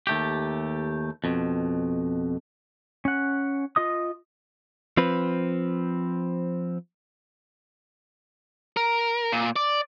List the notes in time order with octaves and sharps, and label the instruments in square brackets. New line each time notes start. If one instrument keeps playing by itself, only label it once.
[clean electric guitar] D#2 A3 G4
F2 B2
[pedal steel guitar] C#4 F#5
F4 D#5 D#6
[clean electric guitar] F3 C4 B4
[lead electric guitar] A#4
A#2
D5